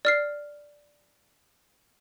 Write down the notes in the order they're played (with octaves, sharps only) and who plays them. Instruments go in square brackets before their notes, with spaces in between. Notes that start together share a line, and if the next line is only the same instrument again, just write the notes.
[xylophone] D5 F6 C7